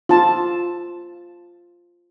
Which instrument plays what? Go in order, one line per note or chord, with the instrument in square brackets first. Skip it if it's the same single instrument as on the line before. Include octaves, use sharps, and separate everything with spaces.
[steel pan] F4 A5